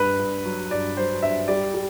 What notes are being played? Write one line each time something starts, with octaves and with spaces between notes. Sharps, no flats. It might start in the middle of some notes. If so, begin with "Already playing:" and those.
Already playing: G2 B4
G2
F#3
G2 D5
F#3 C5
G2 E5
G3 D5
G3